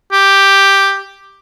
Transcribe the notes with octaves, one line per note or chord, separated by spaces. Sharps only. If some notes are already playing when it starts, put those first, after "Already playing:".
G4